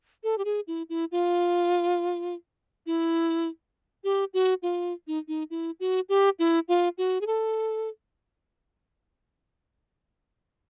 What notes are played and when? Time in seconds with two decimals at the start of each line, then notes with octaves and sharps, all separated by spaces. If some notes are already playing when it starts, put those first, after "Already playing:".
0.24 A4
0.38 G4
0.45 G#4
0.67 E4
0.90 E4
1.12 F4
2.86 E4
4.04 G4
4.34 F#4
4.63 F4
5.07 D#4
5.28 D#4
5.50 E4
5.80 F#4
6.09 G4
6.39 E4
6.68 F4
6.98 F#4
7.21 G#4
7.27 A4